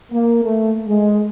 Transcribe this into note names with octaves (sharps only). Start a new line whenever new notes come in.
A#3
A3
G#3